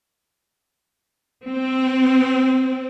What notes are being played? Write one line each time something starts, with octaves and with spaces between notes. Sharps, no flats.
C4